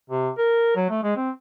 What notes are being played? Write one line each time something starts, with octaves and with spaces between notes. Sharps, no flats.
C3
A#4
F#3
A3
G#3
C4